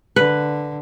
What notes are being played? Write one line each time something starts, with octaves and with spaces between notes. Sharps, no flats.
D3 B4